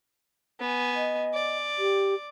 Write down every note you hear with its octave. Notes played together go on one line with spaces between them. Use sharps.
B3 G#5
D#5
D5
G4